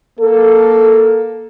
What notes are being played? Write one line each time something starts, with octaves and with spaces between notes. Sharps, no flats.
A#3 A4